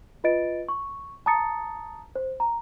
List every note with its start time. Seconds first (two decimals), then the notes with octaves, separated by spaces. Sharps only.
0.24 F4 B4 D#5 A6 D7
0.68 C#6
1.26 A5 A#5 D#6 A6 C#7
2.15 C5
2.40 A#5